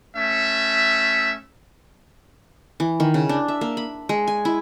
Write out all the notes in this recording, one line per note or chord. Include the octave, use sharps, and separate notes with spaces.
A3 C#4 E5
E3
D#3
C#3
D4
E5
A#3
B5
G#3
G#5
E4